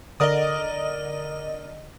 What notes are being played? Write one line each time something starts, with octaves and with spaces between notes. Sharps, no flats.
D3 A#4 D5 D#5 D#6